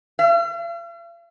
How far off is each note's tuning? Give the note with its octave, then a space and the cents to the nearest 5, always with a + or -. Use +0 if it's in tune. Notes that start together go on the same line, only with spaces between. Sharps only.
F5 -45